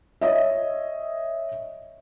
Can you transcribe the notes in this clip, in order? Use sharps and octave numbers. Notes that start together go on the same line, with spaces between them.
C#5 D#5 E5